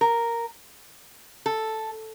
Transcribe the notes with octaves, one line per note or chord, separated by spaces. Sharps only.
A#4
A4